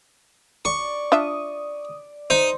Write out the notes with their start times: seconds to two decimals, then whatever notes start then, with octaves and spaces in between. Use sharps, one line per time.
0.65 D5 C#6
1.12 D4 F4 E5 D#6
2.30 D#4 C5